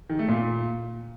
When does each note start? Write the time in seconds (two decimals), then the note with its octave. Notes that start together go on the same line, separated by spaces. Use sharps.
0.10 D#3
0.19 A3
0.28 A#2